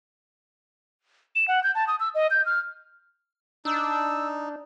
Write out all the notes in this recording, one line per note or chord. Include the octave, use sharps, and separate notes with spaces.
E7
F#5
G6
A5
D#6
E6
D#5
G6
F6
D4 D#4 E6